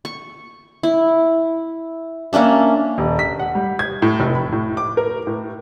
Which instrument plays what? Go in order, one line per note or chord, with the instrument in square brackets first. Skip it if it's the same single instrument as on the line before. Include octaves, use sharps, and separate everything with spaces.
[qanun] C#6
E4
A#3 C#4 D4 E5
[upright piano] D#1
B6
F#5
G3
G#6
A2
F1
B5
A2
D6
A#4
A2